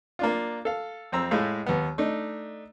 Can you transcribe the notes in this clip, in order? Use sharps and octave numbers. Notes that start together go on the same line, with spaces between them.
A#3 D4 F4
A4 F5
F2 C4 A#5 E6
A2 G#3 A3 F5
D#2 B3
A3 D4 D#4